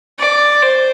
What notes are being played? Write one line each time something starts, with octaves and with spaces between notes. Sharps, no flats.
D5
C5